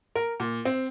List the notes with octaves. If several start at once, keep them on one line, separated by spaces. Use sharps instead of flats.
A#4
A#2
C4